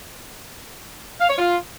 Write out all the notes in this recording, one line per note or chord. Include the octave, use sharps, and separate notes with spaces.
F5
C#5
F4